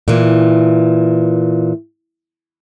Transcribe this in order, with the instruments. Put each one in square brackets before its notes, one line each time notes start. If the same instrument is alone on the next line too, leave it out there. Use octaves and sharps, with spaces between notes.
[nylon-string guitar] A#2 E3